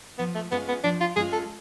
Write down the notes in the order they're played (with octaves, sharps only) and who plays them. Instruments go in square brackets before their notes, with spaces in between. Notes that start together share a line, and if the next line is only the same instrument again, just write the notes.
[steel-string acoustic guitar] F3 [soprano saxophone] B3
[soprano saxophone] A3
[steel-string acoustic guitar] G#3 C#4 F4 [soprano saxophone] B3
[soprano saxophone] B3
[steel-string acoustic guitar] F3 [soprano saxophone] D4
[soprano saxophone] F4
[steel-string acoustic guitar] G#3 C#4 F4 [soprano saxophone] G#4
[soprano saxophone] A4